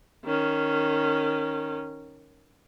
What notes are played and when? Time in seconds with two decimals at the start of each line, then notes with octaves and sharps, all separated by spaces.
0.25 D#3 C#4